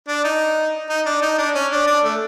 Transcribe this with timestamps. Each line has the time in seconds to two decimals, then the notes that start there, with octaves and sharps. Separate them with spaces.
0.08 D4
0.24 D#4
0.89 D#4
1.06 D4
1.22 D#4
1.38 D4
1.55 C#4
1.71 D4
1.87 D4
2.04 A3